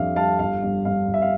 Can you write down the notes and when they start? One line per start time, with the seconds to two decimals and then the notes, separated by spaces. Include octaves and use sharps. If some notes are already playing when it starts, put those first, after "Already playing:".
Already playing: F2 G3 D4 E5 F5
0.16 G3 F5 A5
0.39 G1 F5
0.62 G2
0.85 G2 F5
1.08 G1
1.14 E5
1.22 F5